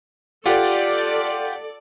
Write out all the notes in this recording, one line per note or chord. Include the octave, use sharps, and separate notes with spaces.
F4 G4 A4 D5 F#5